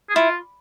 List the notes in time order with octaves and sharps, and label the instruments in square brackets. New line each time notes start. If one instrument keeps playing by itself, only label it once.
[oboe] G#4
[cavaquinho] E4 [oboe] F4